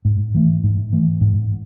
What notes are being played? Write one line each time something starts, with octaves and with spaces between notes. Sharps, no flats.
G#2
E3 A3
G#2
E3 A3
G#2